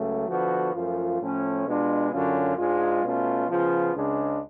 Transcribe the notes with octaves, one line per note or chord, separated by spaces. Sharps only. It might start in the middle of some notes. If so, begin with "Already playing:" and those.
Already playing: C#2 C#3 F#3 A3
D3 F3 B3 F#4
F#2 F3 A3 F4
A2 F3 A3 C#4
B2 G#3 D4 F4
F#2 D3 F#3 C#4 F4
G#2 G#3 D4 F4
B2 A3 C#4 F4
C#3 F3 B3 F4
C#2 C#3 G#3 D4